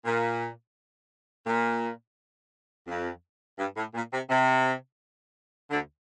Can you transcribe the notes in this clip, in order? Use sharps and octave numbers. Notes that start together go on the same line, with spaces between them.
A#2
A#2
F2
G2
A2
A#2
C3
C3
D2 D3